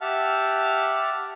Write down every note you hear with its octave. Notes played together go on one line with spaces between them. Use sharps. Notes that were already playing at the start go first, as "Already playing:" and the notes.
G4 E5 F#5 A5 F6